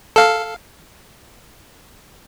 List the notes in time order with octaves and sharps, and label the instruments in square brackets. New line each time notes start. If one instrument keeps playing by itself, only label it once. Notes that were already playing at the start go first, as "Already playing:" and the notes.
[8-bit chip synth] A4 F5